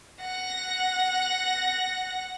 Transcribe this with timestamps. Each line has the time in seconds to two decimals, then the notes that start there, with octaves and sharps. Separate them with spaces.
0.21 F#5 A#6